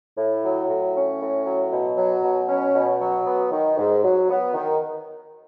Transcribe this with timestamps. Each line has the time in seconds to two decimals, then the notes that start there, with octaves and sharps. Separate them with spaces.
0.17 A2
0.43 F#3
0.69 A2
0.95 C#4
1.21 A2
1.46 F#3
1.71 B2
1.97 F#3
2.23 B2
2.49 C#4
2.74 B2
3.01 F#3
3.25 B3
3.51 D#3
3.78 G#2
4.03 F#3
4.29 B3
4.54 D#3